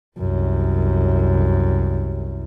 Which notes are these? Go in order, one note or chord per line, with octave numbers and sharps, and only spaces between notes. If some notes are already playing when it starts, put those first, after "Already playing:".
C2 F#2